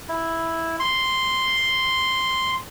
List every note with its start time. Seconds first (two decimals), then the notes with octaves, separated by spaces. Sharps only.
0.09 E4
0.80 C6